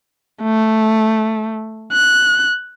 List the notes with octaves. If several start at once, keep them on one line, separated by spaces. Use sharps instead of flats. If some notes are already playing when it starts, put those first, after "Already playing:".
A3
F#6